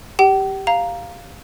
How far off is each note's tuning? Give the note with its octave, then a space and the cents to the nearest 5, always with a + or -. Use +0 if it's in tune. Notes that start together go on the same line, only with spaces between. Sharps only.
G4 +0 G5 -45
F5 +0 A#5 +0